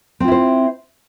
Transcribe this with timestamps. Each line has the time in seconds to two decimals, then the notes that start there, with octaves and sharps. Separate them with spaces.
0.20 C4
0.24 F4
0.28 E4
0.32 C5